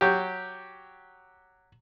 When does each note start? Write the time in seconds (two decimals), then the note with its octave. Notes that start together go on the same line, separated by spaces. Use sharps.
0.01 F#3 G4